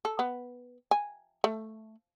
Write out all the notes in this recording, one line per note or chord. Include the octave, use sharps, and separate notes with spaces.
A4
B3
G#5
A3